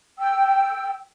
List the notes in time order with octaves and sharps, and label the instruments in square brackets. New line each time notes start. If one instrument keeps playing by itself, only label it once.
[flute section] G5 E6